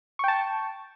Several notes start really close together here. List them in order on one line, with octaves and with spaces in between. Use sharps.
C#6 G5 A5